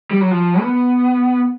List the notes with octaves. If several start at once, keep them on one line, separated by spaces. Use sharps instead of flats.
G3
F#3
F3
B3